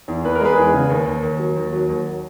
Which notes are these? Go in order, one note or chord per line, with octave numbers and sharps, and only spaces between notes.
E2
E2 B4
A#4
G#3 G#4 B4
E2
C#3
D#2
D#2
D#2
F#3
D#2
F#3
D#2